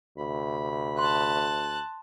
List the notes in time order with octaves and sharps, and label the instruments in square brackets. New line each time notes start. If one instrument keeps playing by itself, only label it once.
[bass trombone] D2 [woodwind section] C3 B5
[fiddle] A5 F#6 [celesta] C6